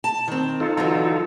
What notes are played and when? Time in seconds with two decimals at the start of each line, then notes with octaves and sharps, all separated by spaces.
0.04 A5
0.28 D#3 C4
0.60 D#4 F4 A4
0.77 D3 E3 F#3